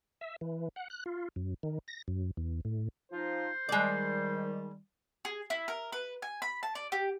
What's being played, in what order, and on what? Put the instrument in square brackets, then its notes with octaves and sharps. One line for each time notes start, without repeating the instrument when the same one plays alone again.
[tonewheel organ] E5
E3
F#5
F#6
F4
F#2
D#3
A#6
F#2
E2
A2
[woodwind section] F3 D#4 F4 [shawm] C5
[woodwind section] D#3 G3 [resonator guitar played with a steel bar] G#3 D5
[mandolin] G#4
E4
A#4
B4
G#5
B5
A5
D5
G4